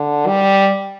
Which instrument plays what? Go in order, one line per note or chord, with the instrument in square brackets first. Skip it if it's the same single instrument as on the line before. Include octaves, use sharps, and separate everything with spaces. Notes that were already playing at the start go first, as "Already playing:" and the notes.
Already playing: [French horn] D3
G3